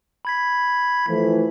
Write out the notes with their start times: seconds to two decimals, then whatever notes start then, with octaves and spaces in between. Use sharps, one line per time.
0.25 B5 G#6 B6
1.07 E3 F3 A3